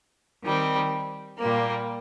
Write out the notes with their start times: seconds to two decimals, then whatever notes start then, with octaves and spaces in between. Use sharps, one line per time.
0.43 D#3 G3 C4
1.38 A#2 G3 A#3